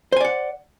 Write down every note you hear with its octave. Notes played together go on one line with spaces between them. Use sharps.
C5 D5 F#5 G#5